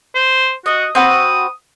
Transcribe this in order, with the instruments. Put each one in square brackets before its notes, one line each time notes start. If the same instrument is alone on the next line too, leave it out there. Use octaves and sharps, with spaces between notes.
[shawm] C5
[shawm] F#4 [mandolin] D#5
[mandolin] C4 F#4 B4 [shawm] D#6